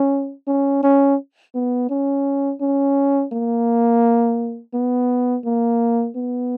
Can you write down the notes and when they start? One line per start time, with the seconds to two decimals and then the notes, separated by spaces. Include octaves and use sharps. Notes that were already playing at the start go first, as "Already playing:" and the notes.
Already playing: C#4
0.48 C#4
0.83 C#4
1.55 B3
1.90 C#4
2.61 C#4
3.32 A#3
4.74 B3
5.45 A#3
6.16 B3